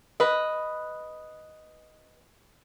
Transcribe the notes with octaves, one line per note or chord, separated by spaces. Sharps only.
B4 D#5